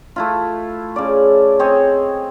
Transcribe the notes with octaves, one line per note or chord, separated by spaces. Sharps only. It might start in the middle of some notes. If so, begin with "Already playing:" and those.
A3 E4 F4
C#3 D5
C4 G#4 C#5 D#5